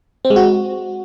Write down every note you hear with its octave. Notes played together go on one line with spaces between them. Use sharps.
C4
G#3
F#4